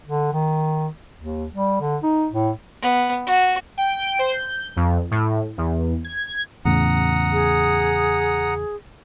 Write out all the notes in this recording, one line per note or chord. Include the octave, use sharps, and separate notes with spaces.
D3
D#3
D#2
G3
D3
D#4
A2
B3
F#4
G5
C5
G6
F2
A2
E2
G#6
E2 A2 C#3 F#5 A#5 D#6
G#4